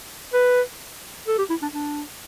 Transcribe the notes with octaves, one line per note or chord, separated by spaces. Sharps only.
B4
A4
G4
E4
D4
D4